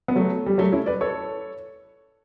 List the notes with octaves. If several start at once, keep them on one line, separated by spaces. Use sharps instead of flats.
B3
F#3 A3
G3
F#3 A3
C#4 E4
B4 D5
A4 C#5